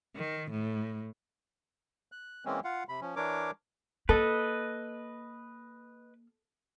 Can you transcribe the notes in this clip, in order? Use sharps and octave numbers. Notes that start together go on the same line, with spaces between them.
D#3
A2
F#6
E3 G#3 A#3 C4 C#4
F4 F5 F#5
C3 B5
F3 C#4
E3 D4 A#4 C#5 D6
A#3 A4 B4 D#5